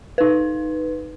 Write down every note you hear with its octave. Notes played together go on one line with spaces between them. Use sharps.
D#4 B4